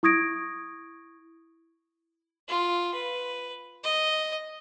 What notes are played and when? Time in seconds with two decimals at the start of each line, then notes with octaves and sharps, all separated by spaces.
0.03 E4 C#6 D#6 G#6 A#6 D7
2.48 F4
2.94 B4
3.84 D#5